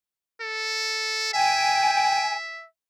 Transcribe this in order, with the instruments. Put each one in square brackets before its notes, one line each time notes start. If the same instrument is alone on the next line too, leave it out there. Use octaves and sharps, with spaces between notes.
[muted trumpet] A4
[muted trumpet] E5 [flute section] G5 G#5